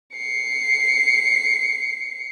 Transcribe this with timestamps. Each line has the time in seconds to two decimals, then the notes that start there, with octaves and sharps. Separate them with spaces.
0.15 C7 C#7